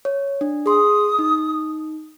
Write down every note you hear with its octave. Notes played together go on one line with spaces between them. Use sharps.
C#5
D4
G#4 C6 D#6
D#4